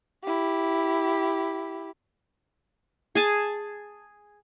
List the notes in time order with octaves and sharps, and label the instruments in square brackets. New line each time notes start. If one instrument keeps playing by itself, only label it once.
[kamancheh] E4 G4
[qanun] G#4 G#5 A5